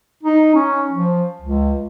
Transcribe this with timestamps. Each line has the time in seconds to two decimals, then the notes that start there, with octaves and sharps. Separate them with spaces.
0.23 D#4
0.55 C#4
0.91 F3
1.42 C#2